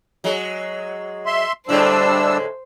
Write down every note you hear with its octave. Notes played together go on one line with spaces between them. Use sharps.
F#3 G#3
E5 C6
A2 D3 G3 G#3 D4 C5 E6